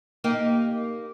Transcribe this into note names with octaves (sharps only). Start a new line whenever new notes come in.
A#3 D#4 G4